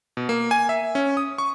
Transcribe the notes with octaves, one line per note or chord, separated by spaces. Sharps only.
B2
A#3
G#5
E5
C#4
D#6
C#6